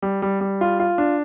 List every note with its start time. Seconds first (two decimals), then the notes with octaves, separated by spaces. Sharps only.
0.02 G3
0.22 G3
0.41 G3
0.61 F4
0.80 F4
0.98 D4